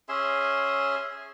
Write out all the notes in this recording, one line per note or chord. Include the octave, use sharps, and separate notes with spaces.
C#4 G#4 E5 C6